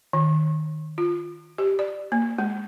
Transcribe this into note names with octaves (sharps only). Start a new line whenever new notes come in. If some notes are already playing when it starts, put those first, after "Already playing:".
D#3
F4
G4
D5
A#3
G#3